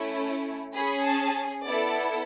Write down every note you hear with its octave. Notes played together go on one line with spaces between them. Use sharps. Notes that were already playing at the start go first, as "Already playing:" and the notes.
Already playing: A3 C#4 E4
C#4 G#4 B5
A5
B3 E4 A4 D5